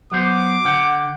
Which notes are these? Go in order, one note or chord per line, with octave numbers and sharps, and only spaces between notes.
F#3 B3 C5 D6
D3 F#5 G5